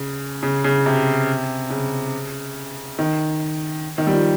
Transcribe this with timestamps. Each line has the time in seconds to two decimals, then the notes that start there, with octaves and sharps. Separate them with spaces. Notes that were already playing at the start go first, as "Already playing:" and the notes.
Already playing: C#3
0.43 C#3
0.64 C#3
0.86 C3
1.70 C#3
2.99 D#3
3.98 D#3
4.07 G3
4.12 F3